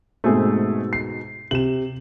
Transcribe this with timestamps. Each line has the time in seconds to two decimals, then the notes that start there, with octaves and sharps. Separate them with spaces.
0.24 G#2 B2 A3 C4 G#4
0.93 C7
1.51 C3 E7 F#7